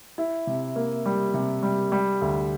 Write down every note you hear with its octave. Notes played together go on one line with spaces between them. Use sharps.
E4
C3
A#3
G3
C3
G3
G3
D2